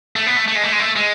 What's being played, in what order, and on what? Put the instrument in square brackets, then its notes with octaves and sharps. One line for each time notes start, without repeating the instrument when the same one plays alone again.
[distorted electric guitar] A3
B3
A3
A3
G#3
A3
G#3
A3
G#3